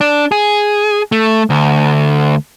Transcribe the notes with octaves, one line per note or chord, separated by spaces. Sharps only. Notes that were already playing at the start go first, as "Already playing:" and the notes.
D4
G#4
A3
D2